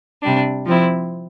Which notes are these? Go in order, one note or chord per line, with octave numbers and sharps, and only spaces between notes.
C3 G3 D4
F3 C4 E4